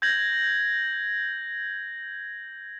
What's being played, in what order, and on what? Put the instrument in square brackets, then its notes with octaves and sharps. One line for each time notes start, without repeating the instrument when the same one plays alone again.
[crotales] G6 G#6 A#6 F#7